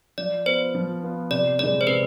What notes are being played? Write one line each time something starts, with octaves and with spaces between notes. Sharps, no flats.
F3 D5
B3 F4 C5
F3
B3 F4
C3 D5
E3 G#3 D5
C5
C3 B4